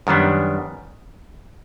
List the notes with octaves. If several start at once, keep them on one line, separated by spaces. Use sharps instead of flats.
F#2 D#3 G3 B3 D4